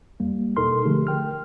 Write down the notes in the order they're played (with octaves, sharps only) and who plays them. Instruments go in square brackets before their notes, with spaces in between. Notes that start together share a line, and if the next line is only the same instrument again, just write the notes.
[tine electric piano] E2 G3 A#3
B2 D#4 A4 A#4 C6 F6
D3 F3 A3 G4 G#4
A#4 G5 F6